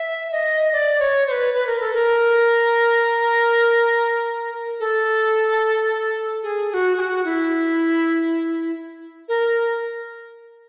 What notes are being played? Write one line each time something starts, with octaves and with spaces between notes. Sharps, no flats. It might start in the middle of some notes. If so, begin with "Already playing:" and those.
Already playing: E5
D#5
D5
C#5
C5
B4
B4
A#4
A4
A#4
A4
G#4
G#4
F#4
G#4
F#4
E4
A#4